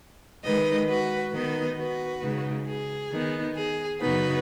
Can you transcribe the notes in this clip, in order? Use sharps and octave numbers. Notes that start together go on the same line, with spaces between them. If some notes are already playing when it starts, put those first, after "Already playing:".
D#3 G#3 D#4 B4 D#5
F#4 B4
D#3 B3 D#4 B4 D#5
F#4 B4
C#3 G#3 D#4
G#4
D#3 B3 D#4
G#4
F#2 C#3 B3 D#4 F#4 B4